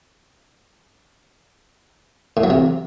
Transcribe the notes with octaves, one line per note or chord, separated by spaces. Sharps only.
A2
F#3
C3